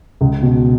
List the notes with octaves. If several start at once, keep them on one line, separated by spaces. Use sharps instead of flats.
C#2
B2